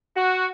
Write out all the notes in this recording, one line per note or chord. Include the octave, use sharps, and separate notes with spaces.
F#4